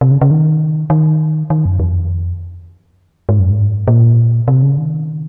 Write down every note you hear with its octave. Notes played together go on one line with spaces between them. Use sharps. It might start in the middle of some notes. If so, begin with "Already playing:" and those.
C3
C#3
C#3
D#3
D#3
D#3
F#2
F2
G#2
F#2
G#2
A#2
C3
C#3
D#3